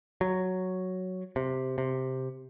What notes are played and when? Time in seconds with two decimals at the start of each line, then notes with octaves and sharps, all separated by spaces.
0.21 F#3
1.36 C3
1.78 C3